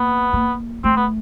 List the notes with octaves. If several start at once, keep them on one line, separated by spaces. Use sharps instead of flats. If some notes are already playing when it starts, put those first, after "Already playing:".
Already playing: A#3 B3
A#3
A3 C4
B3